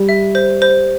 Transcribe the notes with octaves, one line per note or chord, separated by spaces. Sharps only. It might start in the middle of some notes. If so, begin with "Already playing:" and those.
Already playing: G3
E5
C5
C5